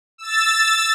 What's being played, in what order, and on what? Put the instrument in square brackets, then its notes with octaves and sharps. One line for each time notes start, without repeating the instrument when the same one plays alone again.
[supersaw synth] E6 A6